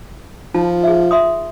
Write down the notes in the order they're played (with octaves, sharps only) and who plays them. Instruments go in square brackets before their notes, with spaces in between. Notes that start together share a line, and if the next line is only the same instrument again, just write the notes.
[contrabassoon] F3 [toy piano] D#4 F4 A5
[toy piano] G#4 E5
E5 C6 D#6